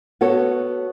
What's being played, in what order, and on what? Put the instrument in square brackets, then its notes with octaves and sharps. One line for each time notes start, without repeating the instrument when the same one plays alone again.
[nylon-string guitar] B3 F#4 A4 C#5